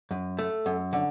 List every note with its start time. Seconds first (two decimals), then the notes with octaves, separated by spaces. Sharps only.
0.11 F#2
0.39 A3
0.66 F#2
0.93 D3